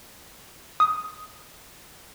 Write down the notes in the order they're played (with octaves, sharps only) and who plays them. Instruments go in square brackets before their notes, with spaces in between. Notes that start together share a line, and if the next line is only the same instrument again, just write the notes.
[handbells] D#6